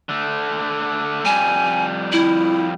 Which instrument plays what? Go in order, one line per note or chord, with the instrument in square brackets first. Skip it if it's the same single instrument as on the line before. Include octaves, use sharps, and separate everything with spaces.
[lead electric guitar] D3 A3
[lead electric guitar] F2 G3 [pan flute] G#5
[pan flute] E4